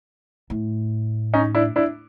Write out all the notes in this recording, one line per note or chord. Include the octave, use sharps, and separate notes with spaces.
A2
C#4 D#4
D4 E4
D4 E4